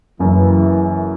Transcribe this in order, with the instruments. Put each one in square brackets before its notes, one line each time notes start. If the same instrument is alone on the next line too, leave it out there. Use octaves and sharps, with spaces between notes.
[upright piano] F#1 F#2 C#3 [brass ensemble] E3